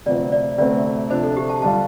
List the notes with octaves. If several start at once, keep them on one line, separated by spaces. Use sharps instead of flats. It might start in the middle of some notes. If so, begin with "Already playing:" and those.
D2 C3 F3 C4 D5
D5
D2 C3 A3 C4 D5
C3 F3 D4 C5
A4
G4
A5
D3 G3 D4 F4 A5